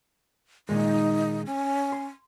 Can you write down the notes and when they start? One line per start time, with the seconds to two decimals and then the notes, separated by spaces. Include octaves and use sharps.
0.69 A#2 D#3 G#3 D#4
1.46 C#4
1.92 C6